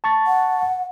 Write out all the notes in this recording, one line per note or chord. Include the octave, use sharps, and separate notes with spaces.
A5 C#6 A6
F#5